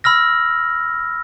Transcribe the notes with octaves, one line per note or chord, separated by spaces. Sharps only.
B5 E6 F6 A#6